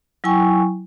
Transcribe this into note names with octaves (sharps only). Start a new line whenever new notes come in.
F#3 E4 G5 G#5 C#6